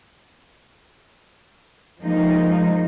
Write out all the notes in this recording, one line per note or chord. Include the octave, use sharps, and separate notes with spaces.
F3 G#3 A#3 D#4